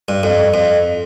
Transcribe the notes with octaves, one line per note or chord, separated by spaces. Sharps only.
G2
F2
F2